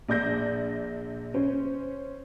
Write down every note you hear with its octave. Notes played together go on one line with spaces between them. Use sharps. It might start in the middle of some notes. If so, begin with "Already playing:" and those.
A#1 D5 G6 A#6
C#4 C5